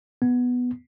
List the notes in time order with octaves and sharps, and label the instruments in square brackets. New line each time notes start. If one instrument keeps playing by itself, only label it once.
[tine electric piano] B3